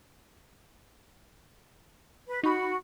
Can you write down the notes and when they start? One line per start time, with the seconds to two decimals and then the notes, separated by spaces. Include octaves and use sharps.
2.26 B4
2.43 D#4 F#4 B5